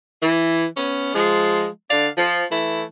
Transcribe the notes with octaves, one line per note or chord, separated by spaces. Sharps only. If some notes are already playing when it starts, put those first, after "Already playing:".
E3
B3 C#4
F3 G#3
D3 D5 F5
F3
E3 A3 E4